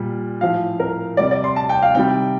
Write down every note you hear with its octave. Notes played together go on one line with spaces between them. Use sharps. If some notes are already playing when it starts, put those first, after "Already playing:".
Already playing: A#2 G3
A2 F3 F5
A#4
C3 G3 D5
D5
C6
A5
G5
F5
C3 D#3 G3 G5